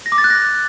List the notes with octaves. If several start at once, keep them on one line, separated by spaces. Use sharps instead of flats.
A#6
D6
A6
F#6
A#6